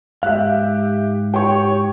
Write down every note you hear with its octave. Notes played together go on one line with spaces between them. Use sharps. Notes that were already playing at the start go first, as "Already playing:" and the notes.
G#2 G4 E5 F5 F#6
G4 C#5 G5 C#6